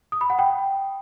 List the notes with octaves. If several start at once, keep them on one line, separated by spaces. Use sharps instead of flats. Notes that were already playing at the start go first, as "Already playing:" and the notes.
D#6
B5
F#5
G5